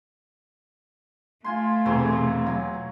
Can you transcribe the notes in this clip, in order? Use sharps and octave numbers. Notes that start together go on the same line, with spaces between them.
A3 F4 G#5 C6
E1 E2 C3 C#5 G#5 C6
F#3